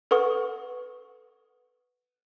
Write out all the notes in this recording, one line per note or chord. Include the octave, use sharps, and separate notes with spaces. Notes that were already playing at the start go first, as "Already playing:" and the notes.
A4 B4 F#5 C#6 D#6